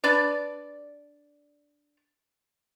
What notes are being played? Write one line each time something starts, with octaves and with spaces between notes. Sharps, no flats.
D4 B4 D5